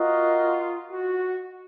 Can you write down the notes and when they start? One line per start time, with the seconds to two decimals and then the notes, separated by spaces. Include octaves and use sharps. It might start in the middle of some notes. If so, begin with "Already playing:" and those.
Already playing: F4 F#4 A#4 D#5
0.91 F#4